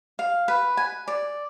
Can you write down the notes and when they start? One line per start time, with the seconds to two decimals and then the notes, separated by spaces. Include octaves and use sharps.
0.19 F5
0.48 B4
0.77 G#5
1.08 D5